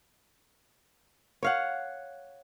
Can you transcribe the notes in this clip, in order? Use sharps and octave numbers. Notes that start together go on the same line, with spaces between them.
C#5 F5 F#5